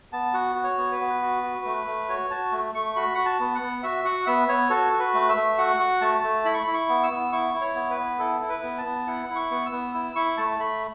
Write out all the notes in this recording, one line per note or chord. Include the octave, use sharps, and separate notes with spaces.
B3 A5
F#4 F#5
F#4
C#5
B3
B4
B3
F#4
F#4
A3
A3
F#4 C#5
F#4 A5
A3
A3 C#6
F#4 B5
F#4 F#5
A5
B3
F#5
B3
F#4 E5
F#4 F#5
B3 E5
B3 C#5
F#4 A4
F#4
B4
A3
E5
A3
F#4 F#5
F#4
A3 A5
A3
E4 B5
C#6
E4 B5
C#6
B3
E6
B3
E4 C#6
E4
C#5
B3
B4
B3
E4 A4
E4
B4
B3
A5
B3
E4 F#5
E4
C#6
B3
E6
B3
E4 E6
E4 C#6
A3 A5
A3 B5